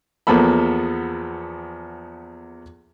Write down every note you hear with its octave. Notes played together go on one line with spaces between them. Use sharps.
E2 F3 A#3 B3 A4 B5